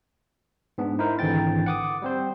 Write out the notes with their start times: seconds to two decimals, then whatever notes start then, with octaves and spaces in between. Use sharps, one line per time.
0.78 G#2 B3 D4
0.99 D#4 E4 A#4 C5
1.19 G#1 D3 E3 G5 A6
1.66 F#5 D6 D#6
2.02 G3 C4 C5